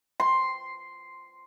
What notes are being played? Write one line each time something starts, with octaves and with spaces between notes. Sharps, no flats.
C6